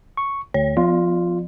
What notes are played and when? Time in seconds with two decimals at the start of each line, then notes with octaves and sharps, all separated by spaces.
0.17 C#6
0.54 D2 C#5
0.77 F3 F4